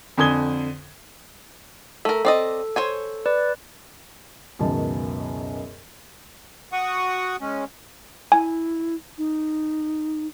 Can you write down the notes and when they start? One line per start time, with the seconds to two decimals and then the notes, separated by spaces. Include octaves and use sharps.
0.18 F2 D3 G#5 D#6 G#6 G7
2.05 A3 A4 A#4
2.25 C4 D5 D#5
2.76 C5 C#5 G#5
3.26 B4 D5
4.59 C#2 F#2 B2 D#3 A5
6.72 F#4 F#5 C#6 D#6
7.41 G#3 C#4
8.32 E4 G#5
9.18 D#4